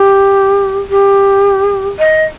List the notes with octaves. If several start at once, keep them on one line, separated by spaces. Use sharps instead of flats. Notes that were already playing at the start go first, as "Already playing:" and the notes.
Already playing: G4
G4
D#5